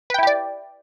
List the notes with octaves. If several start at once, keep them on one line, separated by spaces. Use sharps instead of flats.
E4 G4 B4 D5 G5